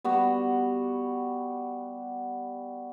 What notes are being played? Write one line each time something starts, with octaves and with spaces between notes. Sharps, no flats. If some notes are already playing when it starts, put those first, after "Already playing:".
G3 B3 F#4